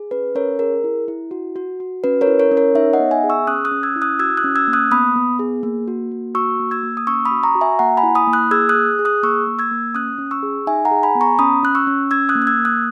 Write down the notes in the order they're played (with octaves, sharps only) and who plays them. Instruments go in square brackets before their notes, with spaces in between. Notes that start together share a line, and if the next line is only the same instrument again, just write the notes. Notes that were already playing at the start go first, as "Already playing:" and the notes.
Already playing: [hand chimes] G#4
C#4 B4
C#4 A#4 C#5
G#4 A#4
E4
E4
F#4
F#4
F#4
C#4 B4
A#4 C#5
E4
A#4 C#5
C#4
A#4 C#5
D#4 C#5 E5
D#5 F#5
B3
E5 G#5
G#4
C#6 E6
C#4 D#6 F#6
D#6 F#6
C#4
E6 G#6
E4
D#6 F#6
F#4 E6 G#6
D#6 F#6
C#4
E6 G#6
A#3
D#6 F#6
B3 B5 D#6
B3
G#4
A#3
F#4
A#3
F#4 C#6 E6
A#3
E6 G#6
A#3
D#6
C#4 C#6 E6
B5 D#6
F#4
A#5 C#6
F#4
E5 G#5
A#3 F#5 A#5
G#5 B5
E4
B5 D#6
A#3
D#6 F#6
G#4 E6 G#6
D#6 F#6
G#4
G#4
D#6 F#6
A#3 C#6 E6
A#3
E6 G#6
A#3
C#4 D#6 F#6
C#4
C#6 E6
G#4
D#4 E5 G#5
F#5 A#5
G#4
G#5 B5
B3
A#5 C#6
C#4 B5 D#6
C#4 F#6
C#6 E6
C#4
C#4 E6 G#6
D#6 F#6
A#3
F#6
E6 G#6
A#3
D#6 F#6